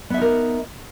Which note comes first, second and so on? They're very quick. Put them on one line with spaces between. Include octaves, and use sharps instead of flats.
B3 E5 D#4 A#4